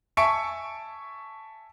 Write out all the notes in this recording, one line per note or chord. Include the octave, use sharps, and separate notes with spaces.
E5 G#5 A5 C#6 C#7 D7